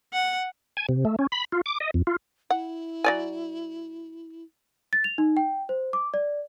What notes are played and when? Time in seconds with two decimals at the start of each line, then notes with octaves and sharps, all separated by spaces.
0.13 F#5
0.77 G#5
0.89 C3
1.05 A3
1.19 C#4
1.32 B5
1.52 F4
1.66 D6
1.80 D#5
1.94 F2
2.07 F4
2.50 E4 F#5
3.04 F#3 D5 G#5
4.93 A6
5.04 F7
5.18 D#4
5.37 G5
5.69 C5
5.93 D6
6.14 D5